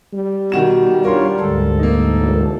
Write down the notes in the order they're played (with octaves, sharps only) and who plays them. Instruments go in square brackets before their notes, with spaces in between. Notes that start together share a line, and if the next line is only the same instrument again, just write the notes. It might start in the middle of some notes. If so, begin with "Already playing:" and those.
[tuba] G3
[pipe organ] B2 [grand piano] D#3 F#4 E7
[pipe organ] D4 F4 C#5 [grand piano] A#4 C6
[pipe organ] D2 G#2 A4
[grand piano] A#3 D#4
[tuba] E1